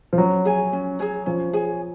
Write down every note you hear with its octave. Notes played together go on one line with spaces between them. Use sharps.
F3
F#3 C#4
G#4 C#5 G#5
C#4
G#4 C#5 G#5
F3 C#4
G#4 C#5 G#5